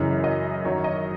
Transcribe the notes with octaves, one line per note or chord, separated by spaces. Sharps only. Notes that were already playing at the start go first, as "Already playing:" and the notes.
Already playing: F#2 C#3 E3 D#5
D#5
F#2 D#3 F#3 C#5
D#5